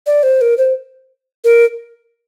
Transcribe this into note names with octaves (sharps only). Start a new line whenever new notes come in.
D5
C5
A#4
C5
A#4